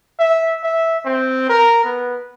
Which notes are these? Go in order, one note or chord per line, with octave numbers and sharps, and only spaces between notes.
E5
E5
C4
A#4
B3